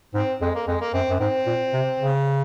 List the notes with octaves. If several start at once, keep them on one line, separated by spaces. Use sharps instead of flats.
G#2 C4
F2 G#3
A#3
F2 G#3
A#3
F#2 C4
F#2
G#2 C4
A#2
C3
C#3